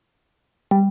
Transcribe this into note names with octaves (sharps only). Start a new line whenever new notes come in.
G3